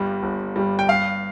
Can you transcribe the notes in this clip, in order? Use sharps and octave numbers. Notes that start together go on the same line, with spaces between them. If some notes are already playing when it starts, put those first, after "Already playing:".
Already playing: G1 G2 G3
G1
G2 G3
G5
G2 F5